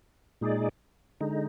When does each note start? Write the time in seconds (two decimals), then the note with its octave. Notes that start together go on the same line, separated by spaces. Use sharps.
0.41 A#2 G#3 D#4 G#4 D5
1.20 D3 G#3 D#4